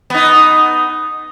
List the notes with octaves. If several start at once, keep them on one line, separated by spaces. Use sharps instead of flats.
B3 D#4